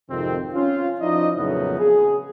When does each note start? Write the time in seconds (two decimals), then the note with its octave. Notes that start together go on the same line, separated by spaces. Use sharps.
0.10 G#1 F2 C3 D#3 C4
0.54 C#4 F4
1.00 F3 D#4 E4 D5 D#5
1.37 F2 A#2 C#3 F#3 A3 B3
1.79 G#4